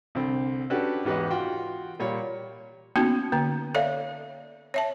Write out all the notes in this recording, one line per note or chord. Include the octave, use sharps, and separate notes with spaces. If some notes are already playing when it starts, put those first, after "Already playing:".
C2 D3 C4
C#4 D4 F#4 G4 A4 B4
E2 G#2 G4 B4 D#5
F4 F#4 F#5 G5 C6
A#2 G3 C#5 B5
A#3 B3 C#4 D#4 F#4
D3 A#3
A4 C#5 D5 E5 F5
C#5 E5 A5